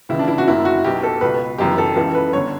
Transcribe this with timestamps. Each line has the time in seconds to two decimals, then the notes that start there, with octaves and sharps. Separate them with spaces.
0.09 C#2 C#3 E3 E4
0.19 D4
0.28 E4
0.38 F#4
0.47 F#1 F#2 D3 E4
0.65 F#4
0.84 B1 B2 G4
1.03 A4
1.21 C#2 B2 B4
1.58 G1 F#2 C#3 E3 G4
1.78 A4
1.96 C#2 C#3 E3 A4
2.15 B4
2.33 G1 D3 C#5